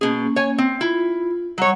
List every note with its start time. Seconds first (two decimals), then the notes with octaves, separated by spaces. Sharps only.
0.01 B2 A#3 C#4 G#4
0.36 C#5 G#5
0.58 C4
0.81 E4 F4
1.58 F#3 G3 C#5 F#5